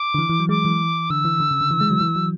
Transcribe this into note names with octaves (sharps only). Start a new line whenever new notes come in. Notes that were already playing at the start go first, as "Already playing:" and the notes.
Already playing: D6
D3
E3
E3
F#3
G#3 D6
E3
D3 E6
E3
D3
C#3
D3
E3
G#3
F#3
E3
F#3